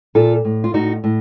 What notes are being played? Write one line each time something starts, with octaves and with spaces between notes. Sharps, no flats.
A#2 F4 A4
A2
F4
A2 D#4 F#4
A2